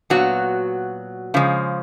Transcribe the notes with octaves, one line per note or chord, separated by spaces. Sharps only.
A#2 F#3 B3 F#4
C#3 F3 G#3